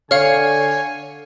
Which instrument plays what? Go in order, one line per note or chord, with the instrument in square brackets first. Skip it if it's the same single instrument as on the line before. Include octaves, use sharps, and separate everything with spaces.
[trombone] D3 [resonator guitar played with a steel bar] C#5 [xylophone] F5 F6 [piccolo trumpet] G#5